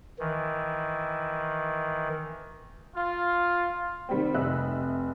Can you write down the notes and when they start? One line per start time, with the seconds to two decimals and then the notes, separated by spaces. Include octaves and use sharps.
0.19 D#3 E3
2.94 F4
4.09 D#3 G3 C4
4.34 F1 C3 D#5 E5 E6 F#6